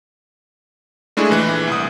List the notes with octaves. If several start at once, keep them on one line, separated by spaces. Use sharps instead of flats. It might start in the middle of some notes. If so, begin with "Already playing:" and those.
G#3 A3 D4 E4 G#4
A#1 E3 F#6
C2 D#6